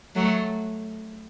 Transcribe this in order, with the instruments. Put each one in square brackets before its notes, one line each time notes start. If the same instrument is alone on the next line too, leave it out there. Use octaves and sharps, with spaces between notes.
[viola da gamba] F#3 A3